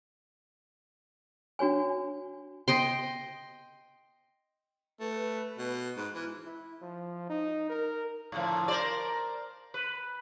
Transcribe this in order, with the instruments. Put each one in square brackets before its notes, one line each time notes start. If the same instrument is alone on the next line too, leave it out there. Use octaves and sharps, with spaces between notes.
[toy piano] D4 F#4 C#5 G#5
[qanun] D#5 G5 C6
[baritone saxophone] A3 [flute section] B4
[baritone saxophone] B2
[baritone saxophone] G#2 [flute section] B5 F#6
[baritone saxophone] E3 [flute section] F6
[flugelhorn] E4
F3
D#4
A#4
[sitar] A2 D3 F3
A#4 C5 D5
B4